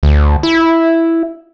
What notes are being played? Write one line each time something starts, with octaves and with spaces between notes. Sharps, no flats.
D2
E4